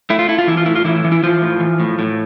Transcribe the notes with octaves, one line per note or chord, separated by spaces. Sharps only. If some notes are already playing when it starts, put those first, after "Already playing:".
A3 E4
F4
A3 E4
F4
E3 E4
F4
A2 E4
F4
A2 E3 E4
E3
E4
E3 F3 F4
A2
E3
A2
A2